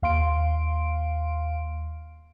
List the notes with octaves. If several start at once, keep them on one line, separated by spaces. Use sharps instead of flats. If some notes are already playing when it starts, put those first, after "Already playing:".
D#2 F5 C6 D7